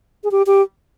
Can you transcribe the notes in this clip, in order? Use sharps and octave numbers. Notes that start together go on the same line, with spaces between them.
G#4
G4
G4